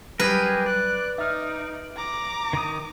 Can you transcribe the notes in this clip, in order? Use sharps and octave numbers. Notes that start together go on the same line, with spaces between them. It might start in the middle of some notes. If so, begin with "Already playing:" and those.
F#3 G3 G4 G#4 A#4 B4
D5 F#6
D#4 E5 F6
A#5 D6
D#3 D#6